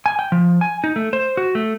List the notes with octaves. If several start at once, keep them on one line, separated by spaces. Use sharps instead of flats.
G#5
G5
F3
G#5
D#4
A3
C5
F#4
A3